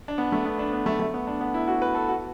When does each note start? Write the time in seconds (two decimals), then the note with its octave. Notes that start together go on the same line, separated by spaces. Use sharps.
0.08 D4
0.18 B3
0.32 A3
0.45 B3
0.59 D4
0.73 B3
0.86 A3
1.00 A3
1.14 B3
1.27 D4
1.41 B3
1.54 E4
1.68 F#4
1.82 B4
1.95 A4
2.08 F#4